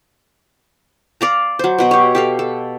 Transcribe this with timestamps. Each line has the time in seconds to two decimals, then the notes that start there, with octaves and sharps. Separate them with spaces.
1.21 D5 F5 A#5
1.59 F#3 C5
1.78 B2 F#4 D#5
1.91 G4 C#5
2.15 G4 A4 F5
2.39 A4